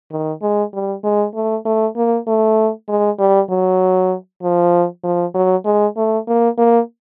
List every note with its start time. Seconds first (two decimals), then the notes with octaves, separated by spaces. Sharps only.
0.11 D#3
0.42 G#3
0.73 G3
1.04 G#3
1.35 A3
1.65 A3
1.96 A#3
2.27 A3
2.89 G#3
3.19 G3
3.50 F#3
4.43 F3
5.04 F3
5.34 F#3
5.65 G#3
5.97 A3
6.28 A#3
6.58 A#3